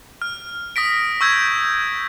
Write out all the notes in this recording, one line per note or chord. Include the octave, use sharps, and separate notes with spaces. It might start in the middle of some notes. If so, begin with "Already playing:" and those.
F6
D#6 A#6 B6 D7
C#6 E6 G6 G#6